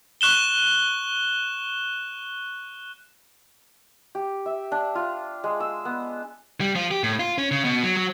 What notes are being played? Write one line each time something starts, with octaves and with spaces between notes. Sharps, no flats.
C#6 F#6 E7 G7
G4
E5
D4
F4
G#3
E6
B3
G3
F3
G4
A2
F4
C#4
C#3
B2
F#3
F#3